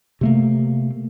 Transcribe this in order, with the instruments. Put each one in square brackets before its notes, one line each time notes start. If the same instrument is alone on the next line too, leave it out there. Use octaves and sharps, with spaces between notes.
[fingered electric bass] C3 A3 A#3